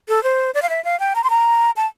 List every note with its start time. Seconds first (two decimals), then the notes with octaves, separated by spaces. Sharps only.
0.09 A4
0.23 C5
0.54 D5
0.62 F5
0.69 E5
0.85 F5
1.00 G5
1.15 A#5
1.24 C6
1.30 A#5
1.76 A5